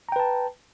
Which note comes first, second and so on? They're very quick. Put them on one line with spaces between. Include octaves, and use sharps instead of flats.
A#5 G5 B4 A5